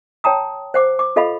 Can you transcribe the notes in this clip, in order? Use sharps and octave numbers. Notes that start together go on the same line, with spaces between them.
C#5 G5 A5 A#5 D#6
C5 F#5 D6
D6
F4 A4 D#5 F5 F#5 B5